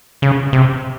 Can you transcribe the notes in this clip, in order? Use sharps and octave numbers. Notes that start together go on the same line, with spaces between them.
C#3
C3